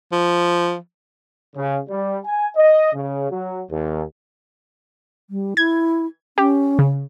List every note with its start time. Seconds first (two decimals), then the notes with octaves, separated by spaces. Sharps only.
0.12 F3
1.56 C#3
1.89 G3
2.25 G#5
2.56 D#5
2.94 C#3
3.30 F#3
3.71 D#2
5.30 G3
5.57 E4 G#6
6.38 C#4 G4
6.79 C#3